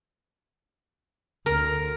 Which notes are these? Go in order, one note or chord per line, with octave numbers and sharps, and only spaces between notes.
D2 A#4